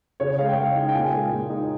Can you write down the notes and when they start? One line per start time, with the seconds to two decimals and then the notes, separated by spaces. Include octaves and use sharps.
0.20 C#3 C#5
0.39 G#3 F5
0.49 G5
0.58 C#3 F5
0.75 D#4
0.89 G5
0.94 A#2 G#5
1.12 G#3
1.31 A#2
1.50 D#4